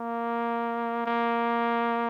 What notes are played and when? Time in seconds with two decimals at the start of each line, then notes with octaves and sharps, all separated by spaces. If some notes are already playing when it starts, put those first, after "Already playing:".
Already playing: A#3
1.06 A#3